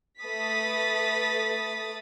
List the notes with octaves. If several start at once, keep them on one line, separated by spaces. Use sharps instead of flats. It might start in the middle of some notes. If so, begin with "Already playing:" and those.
A3 B4 D#6 A6 B6